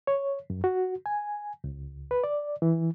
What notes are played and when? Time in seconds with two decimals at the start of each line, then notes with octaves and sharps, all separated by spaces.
0.07 C#5
0.50 F#2
0.64 F#4
1.06 G#5
1.64 C#2
2.11 B4
2.24 D5
2.62 E3